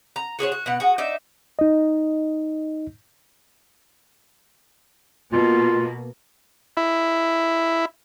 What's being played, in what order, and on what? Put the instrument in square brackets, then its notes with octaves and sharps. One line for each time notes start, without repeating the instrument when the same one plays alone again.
[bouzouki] A#5
F#4 G#4 C5 C#5
F#4
B2 B3 F#5
F#4 G#4
D#4 D5 E5
[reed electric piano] D#4 D#5
[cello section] B2 A#3 [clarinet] F4
[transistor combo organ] E4